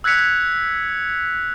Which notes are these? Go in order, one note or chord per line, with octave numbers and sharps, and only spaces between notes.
E6 F#6 G#6 B6 C#7 F7